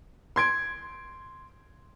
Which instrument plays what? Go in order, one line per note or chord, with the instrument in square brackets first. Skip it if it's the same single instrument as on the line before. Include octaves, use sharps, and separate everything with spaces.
[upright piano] C6 G#6 D7